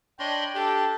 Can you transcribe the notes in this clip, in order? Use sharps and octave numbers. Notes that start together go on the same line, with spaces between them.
D4 C#5 D#5 G5 B5 C6
D4 G4 A4